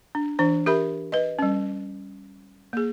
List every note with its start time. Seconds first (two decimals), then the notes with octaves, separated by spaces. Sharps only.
0.15 D4
0.39 E3 D4 C5
0.66 G4 A#4 E5 B5
1.12 B4 D#5
1.39 G3 C#4
2.73 A#3 G#4